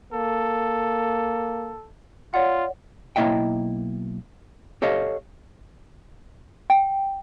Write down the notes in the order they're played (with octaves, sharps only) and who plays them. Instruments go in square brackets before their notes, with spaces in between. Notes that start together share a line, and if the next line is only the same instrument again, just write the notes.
[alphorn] A#3 [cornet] A4
[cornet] F4 [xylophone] C#5 D5 F#5
[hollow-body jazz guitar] B1 A#3 E4 D#5 E5 G5
G4 A4 C#5 D#5 F5
[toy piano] G5